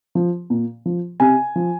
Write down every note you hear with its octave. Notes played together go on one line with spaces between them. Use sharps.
F3
A#2
F3
C3 G#5
F3